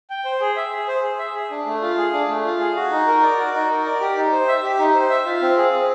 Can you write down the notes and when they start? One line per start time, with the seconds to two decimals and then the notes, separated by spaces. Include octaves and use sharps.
0.10 G5
0.25 C5
0.40 G#4
0.56 E5
0.72 G#4
0.87 C5
1.03 G#4
1.19 E5
1.35 G#4
1.51 D4
1.66 A3
1.82 F4
1.98 G#4
2.13 D4
2.29 A3
2.45 F4
2.60 G#4
2.76 F#4
2.91 D#4
3.07 A#4
3.23 D5
3.38 F#4
3.54 D#4
3.70 A#4
3.86 D5
4.01 G4
4.17 D#4
4.32 C5
4.48 E5
4.63 G4
4.79 D#4
4.95 C5
5.10 E5
5.26 F4
5.42 C4
5.57 G#4
5.73 C4